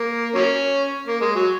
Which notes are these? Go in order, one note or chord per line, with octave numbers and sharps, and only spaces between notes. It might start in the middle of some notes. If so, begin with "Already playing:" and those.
Already playing: A#3
F#3 A#3 C#4
A#3
G#3
F#3